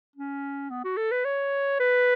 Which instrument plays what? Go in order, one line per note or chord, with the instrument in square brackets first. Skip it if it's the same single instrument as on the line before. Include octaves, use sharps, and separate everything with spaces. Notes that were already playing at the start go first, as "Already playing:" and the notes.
[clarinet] C#4
B3
F#4
A4
B4
C#5
B4